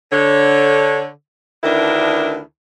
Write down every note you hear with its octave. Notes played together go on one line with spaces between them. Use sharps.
D3 C#5
D2 D#3 D4 E4 A#4 B4